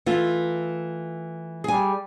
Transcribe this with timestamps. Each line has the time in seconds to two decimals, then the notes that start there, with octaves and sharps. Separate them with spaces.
0.06 E3 A3 F4
1.64 G3 G#4 G#5